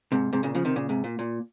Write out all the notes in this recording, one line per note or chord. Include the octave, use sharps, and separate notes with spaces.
G#2 C3
G#2 C3
A#2 C#3
C#3 F3
C3 D#3
A#2 C#3
G#2 C3
A#2
A#2